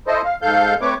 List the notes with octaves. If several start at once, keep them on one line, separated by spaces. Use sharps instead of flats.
E4 A4 C5 D#5
F5
G#2 A4 F5 G6
A3 C4 B4 C#5 D6